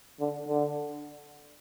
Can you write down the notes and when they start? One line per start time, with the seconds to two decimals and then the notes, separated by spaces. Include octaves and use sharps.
0.20 D3
0.48 D3